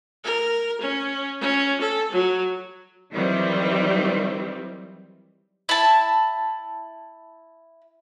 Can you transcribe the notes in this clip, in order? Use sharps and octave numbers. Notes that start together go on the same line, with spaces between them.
A#4
C#4
C#4
A4
F#3
D#3 E3 F#3 G3 C4
E4 A5